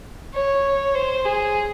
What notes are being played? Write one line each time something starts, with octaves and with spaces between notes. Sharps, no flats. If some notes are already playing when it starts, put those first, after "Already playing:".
C#5
C5
G#4